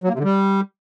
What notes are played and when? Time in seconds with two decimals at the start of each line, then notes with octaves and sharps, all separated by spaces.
0.04 F#3
0.09 A#3
0.14 C3
0.19 D3
0.24 G3